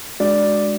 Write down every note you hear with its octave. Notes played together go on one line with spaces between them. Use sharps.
G#3 D4 F#4 D5